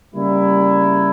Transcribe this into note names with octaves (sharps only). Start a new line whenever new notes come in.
C#3 G3 A#3 E4